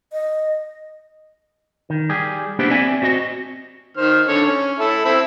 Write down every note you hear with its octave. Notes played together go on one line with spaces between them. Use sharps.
D#5
D#3
G3 G4 G#4
A#3 B3 D4 E4 G4 C5
C4 D5 E5 G#5
C4 F#4 D#5
D#3 C5 F6
D3 A4 C#5
C#4
E4 A4
C4 E4